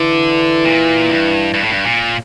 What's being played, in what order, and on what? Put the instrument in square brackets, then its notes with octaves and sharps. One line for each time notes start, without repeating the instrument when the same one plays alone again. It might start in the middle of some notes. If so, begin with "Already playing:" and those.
Already playing: [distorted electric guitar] D3 [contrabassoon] E3
[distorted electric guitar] A#2
G2
G2
A2
G2
A#2